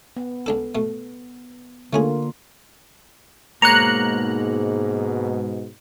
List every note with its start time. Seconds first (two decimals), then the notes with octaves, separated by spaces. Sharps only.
0.17 B3
0.46 C#2 D4 A4
0.75 B2 A3
1.93 D3 A3 A#3 C#4 F4 G#4
3.62 G#2 B2 A#3 C#5 A#5 F#6